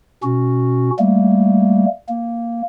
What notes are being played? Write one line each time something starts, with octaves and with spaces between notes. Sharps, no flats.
B2 C#4 F#4
G3 A3 A#3
A#3